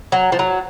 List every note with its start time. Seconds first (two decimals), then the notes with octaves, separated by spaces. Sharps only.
0.12 F#3
0.32 F3
0.39 F#3